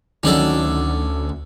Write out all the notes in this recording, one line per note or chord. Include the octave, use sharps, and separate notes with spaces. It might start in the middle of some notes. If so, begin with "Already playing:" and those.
D2 D#3 F#3 C#4 D4 A4